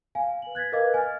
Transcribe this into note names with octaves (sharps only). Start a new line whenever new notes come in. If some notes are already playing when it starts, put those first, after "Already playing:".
F5 G#5
B4 F#7
F#6 G#6 A6 B6
A#4 B4 D#5 F5 D6 G#6
G#5 F6 A6